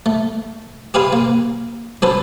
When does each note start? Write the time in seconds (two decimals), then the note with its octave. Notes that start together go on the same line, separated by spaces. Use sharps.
0.06 A3
0.94 G4 G#4 B4 F5 G#5 C6
1.13 A#3
2.02 F#3 C#4 A4 B4 C5